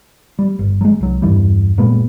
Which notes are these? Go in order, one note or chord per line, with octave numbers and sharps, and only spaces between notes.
G3
G1
F#3 G#3
C2 F#3
E2 G2 E3 G3
F#1 A#2 G#3 B3